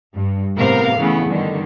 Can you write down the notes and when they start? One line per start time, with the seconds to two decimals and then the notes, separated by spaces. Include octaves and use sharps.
0.14 G2
0.56 A2 C3 B3 A#4 F5
0.99 C#3 E3 A3 B3
1.27 G2 D3 D#3